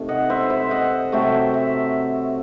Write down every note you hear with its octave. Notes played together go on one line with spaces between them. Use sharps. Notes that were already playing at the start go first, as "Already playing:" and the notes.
Already playing: C3 D#3 A3
D#5 F#5
C5 E5
C5 E5
D#5 F#5
C3 F#3 A3 E5 G5
E5